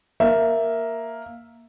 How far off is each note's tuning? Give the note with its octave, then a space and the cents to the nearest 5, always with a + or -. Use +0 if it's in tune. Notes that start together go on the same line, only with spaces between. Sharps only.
A#3 +0 E5 +0